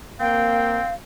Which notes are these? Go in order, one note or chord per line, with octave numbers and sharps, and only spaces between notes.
A#3 C4 F5 G5